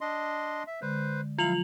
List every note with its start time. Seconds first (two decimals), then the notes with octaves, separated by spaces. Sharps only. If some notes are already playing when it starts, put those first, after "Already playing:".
0.01 D4 D#5 C6
0.67 E5
0.82 D3 G#3 B4 C5 G6
1.39 F3 F#3 E4 F4 F5 F7 F#7